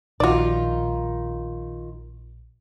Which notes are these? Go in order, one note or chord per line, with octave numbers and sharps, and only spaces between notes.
A#1 D#3 D#4 F4 F#4 D5